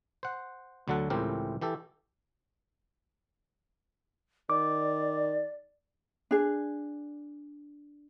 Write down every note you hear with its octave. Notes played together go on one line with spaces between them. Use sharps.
C5 F#5
D2 D3 F#3 A4 F#5
C#2 A2 E3 C4 G4 A#4
E3 G4 A4
D#3 D5 D6
D4 G#4